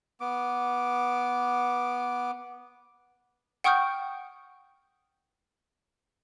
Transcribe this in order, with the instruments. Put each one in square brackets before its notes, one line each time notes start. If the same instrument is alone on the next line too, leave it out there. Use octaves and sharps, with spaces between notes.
[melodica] B3 D6
[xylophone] F#5 G5 C#6 D#6 F6 G6